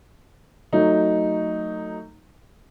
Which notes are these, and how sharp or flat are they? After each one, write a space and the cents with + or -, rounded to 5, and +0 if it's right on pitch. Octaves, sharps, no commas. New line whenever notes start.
F#3 +0 A3 +25 D#4 +0